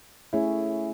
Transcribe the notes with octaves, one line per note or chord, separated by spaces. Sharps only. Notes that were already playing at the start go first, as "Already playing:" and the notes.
A3 C#4 E4 G#4 C#5